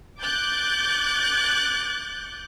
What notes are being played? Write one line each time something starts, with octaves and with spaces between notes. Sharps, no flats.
D6 F#6 G6 A6